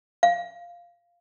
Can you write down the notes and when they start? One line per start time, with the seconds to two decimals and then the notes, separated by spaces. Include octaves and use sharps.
0.23 F5